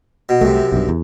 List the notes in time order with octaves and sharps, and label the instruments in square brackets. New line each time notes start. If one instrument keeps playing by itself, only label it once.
[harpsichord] B2
[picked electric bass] C2 A3 [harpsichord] F#2 C3
[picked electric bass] B1 G2
E2